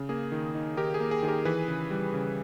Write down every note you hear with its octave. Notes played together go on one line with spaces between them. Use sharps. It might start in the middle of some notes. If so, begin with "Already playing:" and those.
Already playing: C#3
A#3 G#4
D#3
D#4
D#3 G4 A#4
G#4
A#3
G#4
D#3 G#4
G4 A#4
E3 G#4 B4
C#3
G3
C#3